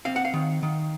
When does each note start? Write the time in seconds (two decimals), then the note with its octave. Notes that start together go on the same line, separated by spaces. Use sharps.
0.05 C4 F5
0.16 F#5
0.25 F5
0.34 D#3
0.63 D#3